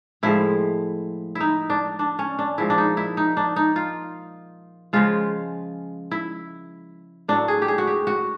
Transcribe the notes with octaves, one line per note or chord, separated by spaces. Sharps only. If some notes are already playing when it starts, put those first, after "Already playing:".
A2 F3 G#3 E4
D#4 E4
D4
D4
C#4
D4
A#2 F3 G#3 E4
D4
D#4
E4
D#4
D4
D#4
F4
C#3 F3 G#3 F4
E4
A2 F#3 D4
G#4
G4
G#4
F#4
G4
F#4